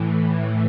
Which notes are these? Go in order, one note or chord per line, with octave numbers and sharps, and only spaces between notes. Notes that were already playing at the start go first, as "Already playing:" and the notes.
Already playing: A2 E3